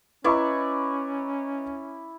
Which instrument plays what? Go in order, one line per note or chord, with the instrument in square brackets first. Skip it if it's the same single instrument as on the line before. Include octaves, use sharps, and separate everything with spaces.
[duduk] C#4 [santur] E4 D5 C#6 [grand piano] B4 D#5 A#5